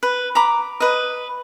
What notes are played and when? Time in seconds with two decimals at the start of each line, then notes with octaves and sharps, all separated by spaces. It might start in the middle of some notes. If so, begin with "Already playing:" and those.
0.03 B4
0.35 A#5 B5 D6
0.80 B4 D#5